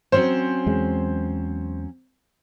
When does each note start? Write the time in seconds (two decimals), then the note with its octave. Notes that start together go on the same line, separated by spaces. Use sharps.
0.12 F#3 C4 C#4 C5
0.66 E2 G#3